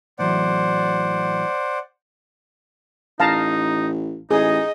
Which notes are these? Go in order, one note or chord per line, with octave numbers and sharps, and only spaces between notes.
A2 E3 F#3 C5 D5 F#5
A1 D#4 F5 A5 A#5
A1 D#4 G#4 D#5